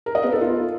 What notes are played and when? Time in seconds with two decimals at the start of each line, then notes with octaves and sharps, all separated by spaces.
0.06 A#4
0.15 D#5
0.24 B3
0.32 A4
0.41 F4